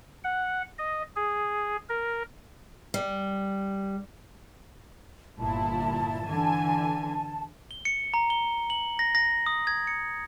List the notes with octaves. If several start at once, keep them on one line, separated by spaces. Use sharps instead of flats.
F#5
D#5
G#4
A#4
G3
G1 A#2 E4 A5
D3 E3 G#5
G7
C#7
A#5
G7
F#7
A#6
A#6
D#6
G#6
C#7